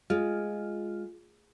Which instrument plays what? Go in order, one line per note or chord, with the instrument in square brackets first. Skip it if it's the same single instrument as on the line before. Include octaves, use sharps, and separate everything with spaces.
[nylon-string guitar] G#3 [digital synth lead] F4